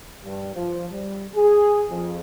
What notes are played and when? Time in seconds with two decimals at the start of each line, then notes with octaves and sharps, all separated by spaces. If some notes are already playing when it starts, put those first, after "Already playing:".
0.23 G2
0.54 F3
0.91 G3
1.35 G#4
1.89 F2